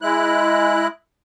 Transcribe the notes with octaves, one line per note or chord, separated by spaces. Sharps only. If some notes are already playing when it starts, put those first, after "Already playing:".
G#3 E4 F#6